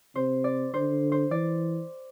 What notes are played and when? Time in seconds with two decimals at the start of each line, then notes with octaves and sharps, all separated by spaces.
0.16 C3 C5
0.44 D5
0.74 D3 C5
1.12 C5
1.31 E3 D5